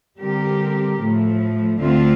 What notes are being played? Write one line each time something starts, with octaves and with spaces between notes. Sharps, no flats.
D3 G3 C4 G4 A#4
A2 F3 A3
D2 D3 A3 C4 F4